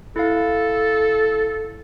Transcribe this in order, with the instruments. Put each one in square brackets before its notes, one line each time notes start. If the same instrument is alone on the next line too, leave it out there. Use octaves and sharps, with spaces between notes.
[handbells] E4 F5 [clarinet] A4